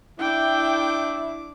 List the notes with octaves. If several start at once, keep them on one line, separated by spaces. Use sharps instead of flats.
D4 E4 G5 D6